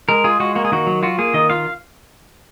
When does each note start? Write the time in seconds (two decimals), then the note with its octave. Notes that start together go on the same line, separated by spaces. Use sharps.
0.09 G#3 A#4
0.24 F4 G#4
0.40 G#3 F#4
0.55 A#3 F#4
0.65 G#4
0.72 D#3 F#4
0.87 F#3
1.03 F4 F#4
1.18 A#3 G#4
1.34 D#3 D#5
1.50 F4 F5